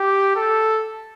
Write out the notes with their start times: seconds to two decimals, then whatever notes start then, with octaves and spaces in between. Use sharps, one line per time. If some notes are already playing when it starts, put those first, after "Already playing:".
Already playing: G4
0.36 A4